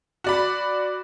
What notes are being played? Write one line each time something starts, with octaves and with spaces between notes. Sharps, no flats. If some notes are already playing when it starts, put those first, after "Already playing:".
F#4 D5 B5